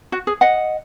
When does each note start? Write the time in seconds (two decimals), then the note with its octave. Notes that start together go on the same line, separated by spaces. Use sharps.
0.12 F#4
0.27 G#4
0.41 D#5 F#5